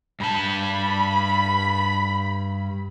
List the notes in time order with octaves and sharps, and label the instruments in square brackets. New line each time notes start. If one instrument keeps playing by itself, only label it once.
[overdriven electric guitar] G2 A5 [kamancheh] B5